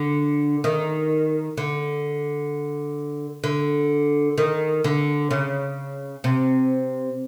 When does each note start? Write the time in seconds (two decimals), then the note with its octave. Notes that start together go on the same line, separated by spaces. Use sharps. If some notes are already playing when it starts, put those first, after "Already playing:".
Already playing: D3
0.64 D#3
1.57 D3
3.44 D3
4.38 D#3
4.84 D3
5.31 C#3
6.24 C3